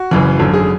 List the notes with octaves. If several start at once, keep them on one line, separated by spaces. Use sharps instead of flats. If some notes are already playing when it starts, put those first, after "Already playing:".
Already playing: F#4
F#1 F#2 C#3 E3
G#1 F#2 D3 A4
G#4